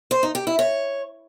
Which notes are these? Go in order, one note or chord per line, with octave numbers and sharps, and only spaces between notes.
C5
D#4
G4
E4
C#5